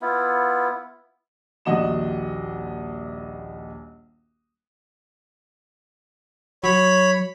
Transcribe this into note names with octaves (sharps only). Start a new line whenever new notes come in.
B3 E4 F4
D#1 A#1 F#4 D#5 F#5 E7
F#3 C#5 B5